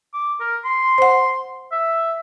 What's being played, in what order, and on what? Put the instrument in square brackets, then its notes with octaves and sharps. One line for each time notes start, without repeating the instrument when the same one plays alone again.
[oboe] D6
A#4
C6
[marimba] C5 F#5
[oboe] E5